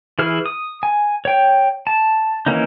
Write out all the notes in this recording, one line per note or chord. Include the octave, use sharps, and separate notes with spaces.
E3 E4 G#4 F6
D#6
G#5
C#5 G5
A5
D#3 E3 A#3 C#4 D#4